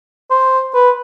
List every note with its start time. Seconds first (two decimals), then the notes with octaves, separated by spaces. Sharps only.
0.31 C5
0.74 B4